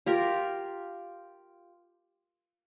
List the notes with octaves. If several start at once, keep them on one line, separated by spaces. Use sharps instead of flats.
F4 G4 A#4